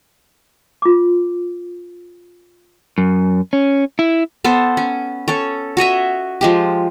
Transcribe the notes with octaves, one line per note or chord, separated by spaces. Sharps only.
F4 D6
F#2
C#4
E4
B3 A4 C5
C#4
C#4 A4 C#5
F#4 C#5 D#5 E5
F3 G#3 G4